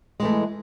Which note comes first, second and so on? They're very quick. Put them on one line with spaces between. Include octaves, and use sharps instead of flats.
G#3 E3 A3